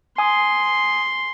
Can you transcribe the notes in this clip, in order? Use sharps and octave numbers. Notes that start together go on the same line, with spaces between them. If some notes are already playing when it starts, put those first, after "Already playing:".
G#5 C6 D#6